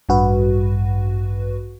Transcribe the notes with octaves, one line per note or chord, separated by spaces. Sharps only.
A1 G2 F#4 B4